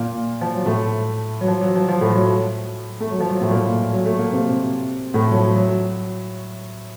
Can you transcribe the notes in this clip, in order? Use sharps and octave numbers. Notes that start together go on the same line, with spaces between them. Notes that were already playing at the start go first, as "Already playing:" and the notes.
Already playing: A#2 A#3
F3
F#3
A2 A3
F#3
F3
F#3
F3
F3
A2 A3
F#3
A3
F#3
F3
F#3
A2 A3
A#2 A#3
F#3
A3
A#3
C3 C4
A2 A3
F#3
F3
F#3